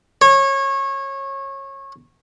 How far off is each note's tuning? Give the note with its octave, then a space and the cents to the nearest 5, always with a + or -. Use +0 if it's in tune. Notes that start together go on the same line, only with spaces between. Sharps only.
C#5 -25